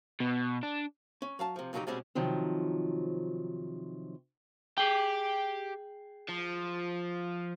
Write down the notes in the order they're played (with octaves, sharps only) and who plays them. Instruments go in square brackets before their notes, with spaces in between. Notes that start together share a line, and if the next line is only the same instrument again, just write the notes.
[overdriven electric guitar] B2
D4
[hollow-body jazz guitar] C#4
F#3 F5 A5
C3 F3
F2 C#3 F#3 D4 D#4 G4
B2 G3 G#3 C4 C#4
[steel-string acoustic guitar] C3 D#3 F3 F#3
[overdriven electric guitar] G4 [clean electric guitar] G#4 G5
[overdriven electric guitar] F3